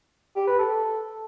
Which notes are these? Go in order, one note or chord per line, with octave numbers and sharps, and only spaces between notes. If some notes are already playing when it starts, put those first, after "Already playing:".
G4
B4
A4